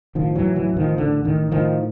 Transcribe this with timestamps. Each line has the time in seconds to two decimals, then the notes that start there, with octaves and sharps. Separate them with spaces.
0.15 A1 D#3 F3
0.35 E3 F#3
0.42 A1
0.56 E3 F#3
0.70 A1
0.77 D#3 F3
0.97 A1 D3
1.24 A1 D#3
1.51 A2 D#3 F3